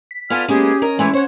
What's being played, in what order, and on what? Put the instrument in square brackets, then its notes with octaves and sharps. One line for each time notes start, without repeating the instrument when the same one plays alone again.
[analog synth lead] B6
[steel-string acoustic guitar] B3 F4 A4 [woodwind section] D5 G#5 F6
[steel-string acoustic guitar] G#3 A#3 B3 [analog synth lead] C#4 [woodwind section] G4 G#4
[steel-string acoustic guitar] A#4 D#5 G#5
[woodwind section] E3 E4 G#5 [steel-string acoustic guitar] G#3 A3 C#5
[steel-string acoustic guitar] C5 F#5 [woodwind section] C#5